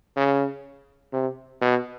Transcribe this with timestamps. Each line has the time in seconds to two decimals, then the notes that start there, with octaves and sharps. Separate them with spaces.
0.16 C#3
1.13 C3
1.61 B2